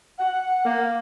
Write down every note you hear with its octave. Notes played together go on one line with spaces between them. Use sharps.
F#5
A#3